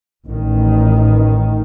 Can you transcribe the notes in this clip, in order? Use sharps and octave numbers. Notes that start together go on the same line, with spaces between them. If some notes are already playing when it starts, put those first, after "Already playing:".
A1 D#3